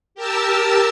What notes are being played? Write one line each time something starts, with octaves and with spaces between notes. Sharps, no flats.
G4 A#4 A5 E6